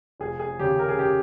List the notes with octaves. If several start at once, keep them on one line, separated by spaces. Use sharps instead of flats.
F1 G#4
G#4
D#2 C#3 G4
A#4
G#4
G4